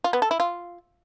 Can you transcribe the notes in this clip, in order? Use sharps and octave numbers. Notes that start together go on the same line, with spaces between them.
F4
B3
A4
E4
F4